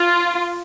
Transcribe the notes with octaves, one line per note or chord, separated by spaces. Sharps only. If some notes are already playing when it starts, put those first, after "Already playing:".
Already playing: F4